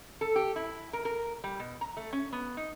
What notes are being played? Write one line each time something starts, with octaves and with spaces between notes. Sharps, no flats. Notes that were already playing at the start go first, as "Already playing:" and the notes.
A4
G4
E4
A#4
A#4
G3
B2
A#5
A3
C#4
B3
D#4